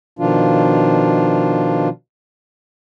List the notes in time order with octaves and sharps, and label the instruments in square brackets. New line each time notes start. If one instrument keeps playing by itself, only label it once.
[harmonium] B2 D#3 F3 D4 F4